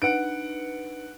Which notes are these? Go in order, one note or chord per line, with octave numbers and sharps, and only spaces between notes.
D4 D#4 B4 F#5 D7